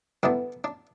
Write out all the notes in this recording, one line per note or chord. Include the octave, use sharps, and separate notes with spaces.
G2 D3 G3 B3 D4 E4
D4